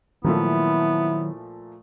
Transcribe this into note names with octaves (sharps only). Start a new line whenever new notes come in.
A#2 D#3 F3 F#3 A3 B3 E4